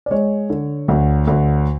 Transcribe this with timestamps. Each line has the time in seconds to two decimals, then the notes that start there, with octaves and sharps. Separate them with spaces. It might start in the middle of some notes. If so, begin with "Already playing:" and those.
0.06 D5
0.11 G#3 C#5
0.50 D3
0.88 D2
1.27 D2